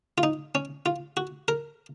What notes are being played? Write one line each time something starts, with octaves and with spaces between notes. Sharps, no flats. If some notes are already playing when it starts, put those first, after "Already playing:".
F4
D#4
C#4
F4
F#4
A#4